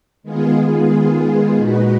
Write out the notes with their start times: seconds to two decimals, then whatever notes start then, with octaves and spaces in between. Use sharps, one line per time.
0.23 D#3 G#3 B3 F4 G#4
1.55 A#2 G#3 D#4 F#4 B4